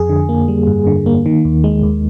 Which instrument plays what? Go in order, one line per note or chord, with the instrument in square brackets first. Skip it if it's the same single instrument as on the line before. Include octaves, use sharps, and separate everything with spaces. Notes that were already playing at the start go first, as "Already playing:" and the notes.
Already playing: [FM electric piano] F2 G#4
D3
A#3
G3
G2
D3
A#3
D#3
D#2
G#3
D#2